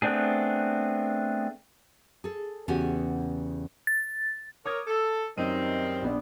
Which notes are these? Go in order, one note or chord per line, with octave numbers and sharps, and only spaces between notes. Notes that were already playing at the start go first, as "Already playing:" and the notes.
A3 B3 C4 D4 G#4
G#4 A4
E2 C#3 B3 F#4 G4 G#5
A6
A#4 C#5 D6 D#6 G#6
A4
F#2 D#3 G3 C4 D#4 D#7
A#1 B3 D4